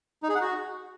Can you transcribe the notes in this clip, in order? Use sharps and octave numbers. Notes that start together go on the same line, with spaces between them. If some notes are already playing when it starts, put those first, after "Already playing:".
D#4
G#4
F#5
F#4